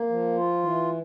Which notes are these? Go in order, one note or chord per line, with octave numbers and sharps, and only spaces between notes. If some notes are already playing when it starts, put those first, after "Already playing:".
Already playing: A#3
F3
F4
E3